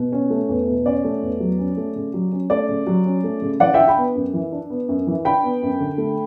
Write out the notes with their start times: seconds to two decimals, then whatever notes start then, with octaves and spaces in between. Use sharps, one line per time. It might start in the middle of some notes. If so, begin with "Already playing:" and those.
Already playing: B2
0.12 C#4
0.30 A3
0.49 E2
0.67 B2
0.85 C#4 D5
1.04 A3
1.22 E2
1.40 F#3
1.59 C#4
1.77 A3
1.96 C#3
2.14 F#3
2.32 C#4
2.50 A3 D5
2.69 C#3
2.87 F#3
3.06 C#4
3.24 A3
3.42 C#3
3.60 E3 D5 F#5
3.74 D4 E5 G5
3.88 G5 B5
3.97 B3
4.15 F#2
4.33 E3
4.52 D4
4.70 B3
4.89 F#2
5.07 E3
5.25 D4 G5 B5
5.44 B3
5.62 F#2
5.80 D3
5.98 A3